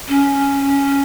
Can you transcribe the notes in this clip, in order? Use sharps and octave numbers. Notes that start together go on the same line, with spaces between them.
C#4